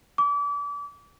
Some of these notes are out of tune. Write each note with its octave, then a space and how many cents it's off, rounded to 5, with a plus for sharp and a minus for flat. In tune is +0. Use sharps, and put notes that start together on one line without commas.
D6 -35